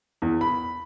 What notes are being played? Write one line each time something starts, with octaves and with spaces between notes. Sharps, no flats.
E2
B5